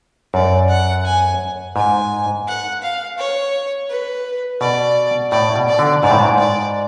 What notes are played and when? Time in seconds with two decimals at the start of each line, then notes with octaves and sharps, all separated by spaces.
0.34 F#2 D5
0.69 F#5
1.05 G#5
1.76 G#2 G#5
2.48 F#5
2.82 F5
3.18 C#5
3.89 B4
4.61 B2 D5
5.31 A2 D5
5.56 B2
5.68 D5
5.79 D3
6.03 G#2 D5
6.11 A2
6.20 G#2
6.38 D5